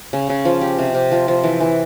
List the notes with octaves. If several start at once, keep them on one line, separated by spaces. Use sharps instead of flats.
C#3
C#3
F3
G4
C3
C3
F3
F3
E3
E3